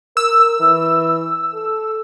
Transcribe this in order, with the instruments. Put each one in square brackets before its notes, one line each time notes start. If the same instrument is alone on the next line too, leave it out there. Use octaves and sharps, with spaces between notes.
[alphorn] A#4 [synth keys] E6
[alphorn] E3
A4